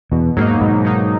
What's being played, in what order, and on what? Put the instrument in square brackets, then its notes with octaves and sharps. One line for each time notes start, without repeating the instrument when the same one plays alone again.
[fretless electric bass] E2 [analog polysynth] B2
[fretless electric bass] G#2 [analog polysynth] F#3 A#3 D#4
[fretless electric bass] G#2 [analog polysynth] B2
[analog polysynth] F#3 A#3 D#4